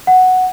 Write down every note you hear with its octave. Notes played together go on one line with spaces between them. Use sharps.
F#5